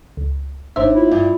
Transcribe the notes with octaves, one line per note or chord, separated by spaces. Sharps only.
C#2
G#1 D#2 D4 C5 E5
E4 F4
G2